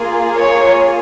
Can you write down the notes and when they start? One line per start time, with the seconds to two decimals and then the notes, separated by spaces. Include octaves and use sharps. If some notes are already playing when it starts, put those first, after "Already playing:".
Already playing: A#3 F4 G#4
0.35 C#5